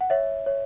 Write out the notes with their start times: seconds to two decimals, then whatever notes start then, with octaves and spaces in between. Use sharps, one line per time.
0.01 F#5
0.10 C#5 E5
0.46 C#5